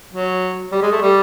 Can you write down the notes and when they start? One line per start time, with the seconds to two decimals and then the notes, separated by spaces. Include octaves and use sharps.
0.13 F#3
0.72 G3
0.82 G#3
0.92 A3
1.01 G3